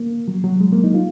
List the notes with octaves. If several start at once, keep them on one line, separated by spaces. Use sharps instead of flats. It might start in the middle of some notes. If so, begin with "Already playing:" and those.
Already playing: A#3
F#3
F#3
G#3
A#3
D#4
F4